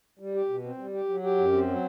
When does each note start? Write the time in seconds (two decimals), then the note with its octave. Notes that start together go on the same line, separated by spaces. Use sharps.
0.19 G3
0.34 G4
0.49 B2
0.64 C4
0.79 G3
0.94 G4
1.09 F#3
1.23 G4
1.38 F#2
1.52 C4
1.68 F#3